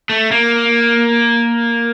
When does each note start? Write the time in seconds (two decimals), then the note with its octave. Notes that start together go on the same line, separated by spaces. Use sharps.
0.09 A3
0.31 A#3